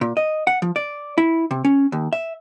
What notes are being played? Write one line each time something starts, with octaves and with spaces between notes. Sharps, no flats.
A#2
D#5
F#5
F3
D5
E4
C3
C#4
D#2
E5